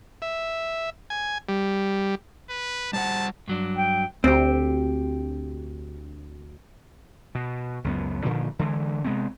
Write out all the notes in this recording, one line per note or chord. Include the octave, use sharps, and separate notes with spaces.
E5
G#5
G3
B4
G3 C5 F#5 A5
G2 F#3 D4
G5
D2 C4 G4
B2
C#2 F#2 B3
A#2 D3 D#3 F3
D3 E3 G#3
C3 G#3 B3 C4